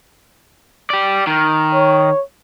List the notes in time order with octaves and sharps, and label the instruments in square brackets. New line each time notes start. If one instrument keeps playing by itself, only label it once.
[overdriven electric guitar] G4 D5
D#3
[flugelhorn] C#5